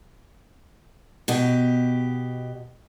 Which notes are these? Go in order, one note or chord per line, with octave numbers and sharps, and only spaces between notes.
B2 G4